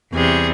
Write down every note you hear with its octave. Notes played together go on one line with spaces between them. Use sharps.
E2 C3 G3 G#4